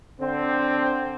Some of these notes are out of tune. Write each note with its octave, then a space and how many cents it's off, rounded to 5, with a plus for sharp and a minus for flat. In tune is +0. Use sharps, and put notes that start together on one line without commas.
D3 +0 C4 +0